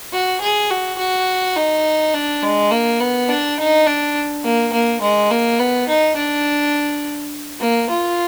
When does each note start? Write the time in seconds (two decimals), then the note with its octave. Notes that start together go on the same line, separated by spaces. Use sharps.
0.13 F#4
0.41 G#4
0.70 F#4
0.99 F#4
1.56 D#4
2.14 D4
2.43 G#3
2.71 A#3
3.00 B3
3.29 D4
3.58 D#4
3.87 D4
4.44 A#3
4.73 A#3
5.01 G#3
5.31 A#3
5.59 B3
5.88 D#4
6.17 D4
7.61 A#3
7.90 F4